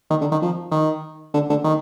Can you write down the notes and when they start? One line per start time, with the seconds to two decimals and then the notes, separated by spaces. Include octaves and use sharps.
0.10 D#3
0.21 D3
0.32 D#3
0.42 F3
0.72 D#3
1.34 D3
1.50 D3
1.64 D#3